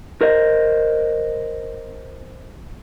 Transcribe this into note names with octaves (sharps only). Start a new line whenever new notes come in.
A#4 C5 D#5